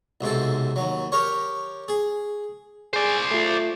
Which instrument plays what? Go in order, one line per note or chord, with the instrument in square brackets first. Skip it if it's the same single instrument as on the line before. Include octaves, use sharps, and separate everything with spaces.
[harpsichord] B1 G#2 C3 A4
D#2 F#3
G4 A#4 C#5
G#4
[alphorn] G#4 [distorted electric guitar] C5 D5
[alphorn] A3 [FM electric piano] F4 A4